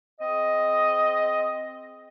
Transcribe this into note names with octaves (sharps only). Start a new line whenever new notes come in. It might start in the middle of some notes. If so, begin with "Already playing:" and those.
C4 G#4 D#5